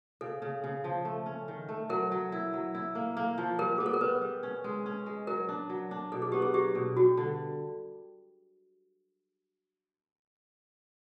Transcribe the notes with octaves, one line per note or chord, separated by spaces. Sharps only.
C#3 A4
C#3
C#3
F3
A3
C#4
D#3
A3
F#3 A#4
F#3
E4
F#3
E4
A#3
A#3
F3
G3 A#4
B3 G#4
A4
A#4
B3 B4
G3
C#4
G#3
C#4
G#3
F#3 A#4
D4
F#3
D4
B2 A4
G#4
B3 G4
G#4
F#3 G4
B2
G3 F#4
D3